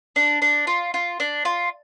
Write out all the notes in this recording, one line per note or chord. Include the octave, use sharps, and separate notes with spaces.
D4
D4
F4
F4
D4
F4